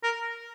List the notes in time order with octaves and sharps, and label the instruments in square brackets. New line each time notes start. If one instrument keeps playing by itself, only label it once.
[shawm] A#4